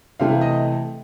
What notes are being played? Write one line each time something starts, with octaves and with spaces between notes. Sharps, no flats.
C3 E3 A3 F5
D#5